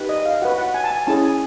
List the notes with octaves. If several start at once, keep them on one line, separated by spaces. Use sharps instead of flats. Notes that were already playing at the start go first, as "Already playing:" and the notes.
Already playing: D#4 G4 B4
D#5
F5
F#4 B4 F#5
F#5
G#5
A5
G#5
C#4 E4 G#4 A5
G#5